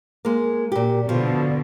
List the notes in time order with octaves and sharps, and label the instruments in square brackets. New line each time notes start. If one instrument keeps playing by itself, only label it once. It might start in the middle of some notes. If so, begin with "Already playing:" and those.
[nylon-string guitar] G#3 A#3
A#2 G4
[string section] B2 D3 [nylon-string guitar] F3